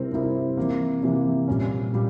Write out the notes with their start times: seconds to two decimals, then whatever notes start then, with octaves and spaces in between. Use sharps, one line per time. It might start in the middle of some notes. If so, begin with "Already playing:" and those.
Already playing: C3 G3 C4 E4 A#4
0.12 C3 G3 C4 E4 A#4
0.57 C3 E3 A#3
1.03 C3 E3 A#3
1.48 A#2 G3 C#4
1.93 A#2 G3